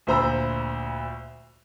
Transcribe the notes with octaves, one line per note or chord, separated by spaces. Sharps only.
D2 A#2 C5 A#5 B5 E6